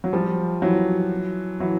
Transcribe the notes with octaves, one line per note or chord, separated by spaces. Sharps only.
F#3
F3 G3
E3 F#3
E3 F#3